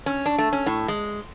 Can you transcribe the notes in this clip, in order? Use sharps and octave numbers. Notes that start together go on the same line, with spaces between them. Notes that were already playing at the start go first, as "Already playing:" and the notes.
C#4
D4
A3
C#4
A2
G#3